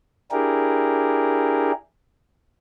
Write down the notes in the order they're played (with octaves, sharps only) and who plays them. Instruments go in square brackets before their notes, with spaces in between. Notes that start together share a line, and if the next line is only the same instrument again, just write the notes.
[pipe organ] D4 E4 G4 G#4 A#4